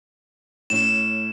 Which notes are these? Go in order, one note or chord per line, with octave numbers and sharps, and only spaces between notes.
A2 C#4 E7